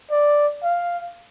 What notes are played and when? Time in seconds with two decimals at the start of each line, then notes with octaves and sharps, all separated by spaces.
0.11 D5
0.63 F5